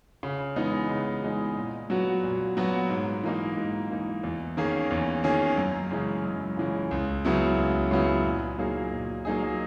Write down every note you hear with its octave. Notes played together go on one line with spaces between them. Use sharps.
C#3
E3 G#3 B3 D#4
C#3
E3 G#3 B3 D#4
A#2
F#3 B3 F#4
A#2
F#3 B3 F#4
G#2
E3 A#3 D#4
G#2
E3 A#3 D#4
E2
D#3 A#3 C#4 G#4
E2
D#3 A#3 C#4 G#4
F#2
C#3 E3 G#3 C#4
F#2
C#3 E3 G#3 C#4
C#2
C#3 F#3 B3 E4
C#2
C#3 F#3 B3 E4
A#2
F#3 A#3 D#4 G#4
A#2
F#3 A#3 D#4 G#4